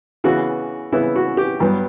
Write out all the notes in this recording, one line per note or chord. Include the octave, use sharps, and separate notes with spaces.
C#3 E3 B3 F#4
C#3 E3 B3 E4
F#4
G4
G2 F#3 B3